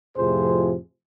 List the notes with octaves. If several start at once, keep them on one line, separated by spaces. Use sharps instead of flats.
F2 A2 C3 F3 G#4 C5